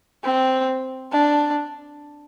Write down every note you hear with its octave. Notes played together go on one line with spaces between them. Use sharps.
C4
D4